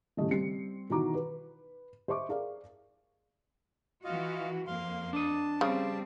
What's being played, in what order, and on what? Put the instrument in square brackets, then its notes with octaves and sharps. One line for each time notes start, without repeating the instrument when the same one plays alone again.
[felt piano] D#1 A2 C#3 G3 A3 D#5
G3 C4 C7 C#7
B2 D#3 E3 F#4 A#5 D6
B4
C5 D#5 E5 C#6 D6
G#4 A#4 D5 F5
[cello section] E3 F#4 [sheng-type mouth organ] F4 D#5 F5
[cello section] F2 A#3 [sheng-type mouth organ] F5 C6
[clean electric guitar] D4 D#5 [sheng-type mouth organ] A5
[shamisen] C#3 [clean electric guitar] G3 [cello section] C4